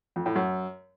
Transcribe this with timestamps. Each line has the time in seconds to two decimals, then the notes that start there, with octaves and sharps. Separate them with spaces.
0.16 F2
0.26 A2
0.35 F#2